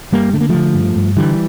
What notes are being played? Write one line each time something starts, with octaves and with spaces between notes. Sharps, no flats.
G2 G3 A#3
D3 A3
A#3
D3 F3 A3
G2
G2
D3 E3 G3